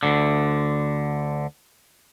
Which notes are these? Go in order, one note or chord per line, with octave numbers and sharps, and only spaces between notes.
D2 D3